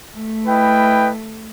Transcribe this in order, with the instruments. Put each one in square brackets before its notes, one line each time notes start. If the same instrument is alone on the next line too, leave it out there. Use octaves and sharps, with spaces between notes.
[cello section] A3
[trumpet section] E4 B4 D#5 G5